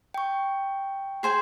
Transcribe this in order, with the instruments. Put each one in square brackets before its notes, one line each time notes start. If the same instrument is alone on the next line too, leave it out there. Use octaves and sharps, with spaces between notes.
[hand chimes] G5 C#6
[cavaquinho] G#4 C5 G#5